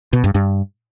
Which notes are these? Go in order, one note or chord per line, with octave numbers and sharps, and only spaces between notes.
B2
G2
G2